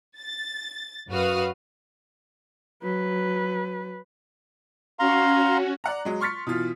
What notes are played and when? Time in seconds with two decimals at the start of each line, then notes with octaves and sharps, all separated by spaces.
0.18 A6
1.10 F#2 F#4 B4 F5 D#6 F6
2.83 F#3 B4
4.99 C#4 F#4 F5 A#5 C6
5.84 D5 F#5 A#5
6.05 F#3 G#3
6.21 C6 C#6 F6 A6 B6 C#7
6.47 B2 E3 F4